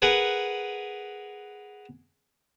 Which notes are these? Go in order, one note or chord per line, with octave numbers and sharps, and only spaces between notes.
G#4 A#4 B4 F#5 G#5